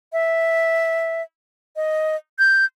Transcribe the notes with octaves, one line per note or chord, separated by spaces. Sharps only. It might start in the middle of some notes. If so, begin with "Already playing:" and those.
E5
D#5
G6